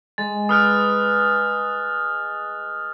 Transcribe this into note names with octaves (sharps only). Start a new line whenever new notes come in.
G#3 A6
B4 D#6 F6 F#6